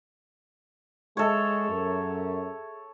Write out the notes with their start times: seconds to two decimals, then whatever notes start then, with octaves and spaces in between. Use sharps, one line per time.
1.17 G#3 G#4 A4 C#5 E5
1.69 F#2